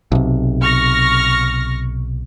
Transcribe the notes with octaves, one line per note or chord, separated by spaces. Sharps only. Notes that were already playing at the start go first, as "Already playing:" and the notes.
B1 C3
C#6 F6 A#6